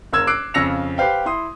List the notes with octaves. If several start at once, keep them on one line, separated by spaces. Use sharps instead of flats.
F#1 A#4 E6 G#6 E7
D6 E6 F#6 C7 D7
F2 C#3 E6 A#6 C#7 F7
G4 B4 C5 F5 G5
E4 C6 D#6